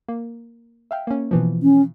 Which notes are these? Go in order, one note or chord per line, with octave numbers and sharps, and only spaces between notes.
A#3
E5 F5 G5
A#3 C#4
B2 E3 F3
C#4